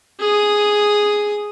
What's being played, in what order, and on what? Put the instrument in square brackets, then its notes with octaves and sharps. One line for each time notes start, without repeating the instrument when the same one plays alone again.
[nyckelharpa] G#4 D#6